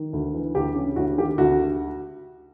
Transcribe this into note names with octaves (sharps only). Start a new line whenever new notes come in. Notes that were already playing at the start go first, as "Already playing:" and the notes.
Already playing: D#3
D2
E3
D2 G4
C#3
D2 F#4
D#3 G4
D2 F#4